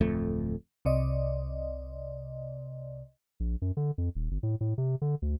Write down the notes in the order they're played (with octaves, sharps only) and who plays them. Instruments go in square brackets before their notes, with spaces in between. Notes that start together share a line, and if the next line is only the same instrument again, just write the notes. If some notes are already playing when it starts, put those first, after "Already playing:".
[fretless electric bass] D1 F2 A3
[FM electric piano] C2 C3 D5 D#5
[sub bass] A#1
F#2
D3
F2
D#1
G1
A2
A2
C3
D3
D2